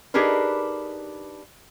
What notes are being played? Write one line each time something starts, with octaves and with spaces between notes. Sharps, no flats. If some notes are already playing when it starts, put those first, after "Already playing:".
D4 D#4 G4 G#4 A#4 B4